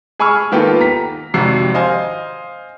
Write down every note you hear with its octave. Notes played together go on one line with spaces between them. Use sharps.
G#4 G#5 B5 C#6 E6 F6
D#3 A#3 B3 F4 G4 A4
A#5 B6
G#1 F2 C3 F#4 C7
C5 D#5 F5 G#5